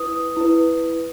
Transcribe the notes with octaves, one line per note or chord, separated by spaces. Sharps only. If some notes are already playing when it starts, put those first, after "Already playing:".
Already playing: E4 B4 D#6
E4 B4